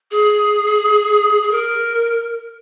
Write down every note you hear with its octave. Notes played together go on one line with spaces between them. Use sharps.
G#4
G#4
A#4